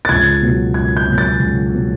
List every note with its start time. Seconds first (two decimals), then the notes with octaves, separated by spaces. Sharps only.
0.05 A6
0.09 C#2 G#6
0.42 B2 F#3 B3
0.74 C#2 G#6
0.97 G6
1.07 B2 F#3 B3
1.18 A6
1.40 C#2
1.73 B2 F#3 B3